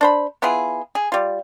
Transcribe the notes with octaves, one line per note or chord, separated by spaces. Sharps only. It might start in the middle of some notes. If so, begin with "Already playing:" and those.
D4 C5 B5
B3 E4 F4 G#4
G#4
G3 F4